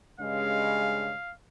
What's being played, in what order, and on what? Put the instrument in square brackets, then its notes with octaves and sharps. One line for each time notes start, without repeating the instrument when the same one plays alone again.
[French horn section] G2 C#3 G#3 [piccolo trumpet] F5